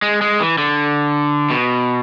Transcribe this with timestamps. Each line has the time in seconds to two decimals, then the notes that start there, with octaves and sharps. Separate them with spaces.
0.02 G#3
0.21 G#3
0.40 E3
0.58 D3
1.50 B2